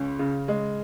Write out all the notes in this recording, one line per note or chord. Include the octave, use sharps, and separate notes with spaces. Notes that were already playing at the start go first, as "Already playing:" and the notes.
Already playing: C#2 C#4
C#3
G#3